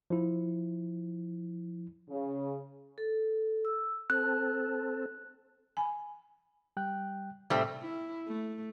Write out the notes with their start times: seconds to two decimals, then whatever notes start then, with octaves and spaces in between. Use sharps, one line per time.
0.10 F3 E4
2.09 C#3
2.98 A4
3.65 E6
4.10 C4 A4 F#6
5.77 G#5 B5
6.77 G3 G5 F#6
7.50 A2 C3 G3 A3 C4
7.81 E4
8.27 A3